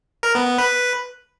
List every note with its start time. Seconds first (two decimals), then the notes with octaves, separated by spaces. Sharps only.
0.23 A#4
0.35 B3
0.47 B3
0.58 B4